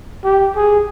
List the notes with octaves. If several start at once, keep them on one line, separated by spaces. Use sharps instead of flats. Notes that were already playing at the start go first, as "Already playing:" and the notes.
G4
G#4